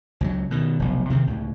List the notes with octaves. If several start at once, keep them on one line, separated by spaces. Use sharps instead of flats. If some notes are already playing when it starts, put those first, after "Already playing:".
C#2 F3 F#3
B2 D#3
F1 B1
C3 D#3 C4
C#2 A2